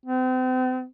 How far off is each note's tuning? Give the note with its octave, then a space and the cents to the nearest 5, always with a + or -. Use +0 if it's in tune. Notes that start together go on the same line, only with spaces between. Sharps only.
C4 -40